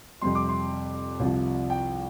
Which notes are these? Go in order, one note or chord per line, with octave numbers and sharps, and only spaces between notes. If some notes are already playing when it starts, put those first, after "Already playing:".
F2 C3 G3 C6
D6
C6
C2 C3 F3
G5